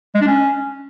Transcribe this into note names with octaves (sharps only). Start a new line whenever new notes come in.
G#3
D4
C#4